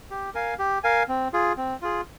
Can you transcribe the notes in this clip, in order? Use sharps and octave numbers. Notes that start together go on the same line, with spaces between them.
G4
A#4 F5 G#5
G4
A#4 F5 G#5
C4
F4 G#4
C4
F4 G#4